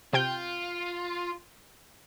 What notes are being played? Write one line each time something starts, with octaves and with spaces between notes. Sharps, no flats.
C3 F4 G5 G6